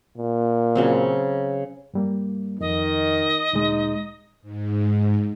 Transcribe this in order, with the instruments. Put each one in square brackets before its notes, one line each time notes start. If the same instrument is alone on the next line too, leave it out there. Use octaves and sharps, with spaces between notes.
[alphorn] A#2
[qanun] C#3 F#3 C4
[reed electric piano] G2 G3 A#3
[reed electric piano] F2 [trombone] D#3 [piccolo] D#5
[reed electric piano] D2 A#2 G#3 [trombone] D#4
[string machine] G#2